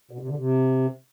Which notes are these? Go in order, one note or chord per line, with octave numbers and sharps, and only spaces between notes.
B2
C3
D3
C3